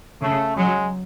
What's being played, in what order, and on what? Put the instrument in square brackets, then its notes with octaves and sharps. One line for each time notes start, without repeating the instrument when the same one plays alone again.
[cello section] C#3 [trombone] A3
[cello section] F#3 [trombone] G#3